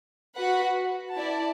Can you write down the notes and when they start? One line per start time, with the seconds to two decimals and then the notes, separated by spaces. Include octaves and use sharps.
0.36 F#4 B4 F#5
1.13 E4 D5 A5